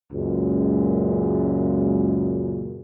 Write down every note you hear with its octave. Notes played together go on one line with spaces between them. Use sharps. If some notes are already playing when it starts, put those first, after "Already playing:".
C#2 F#2 A#2 G#3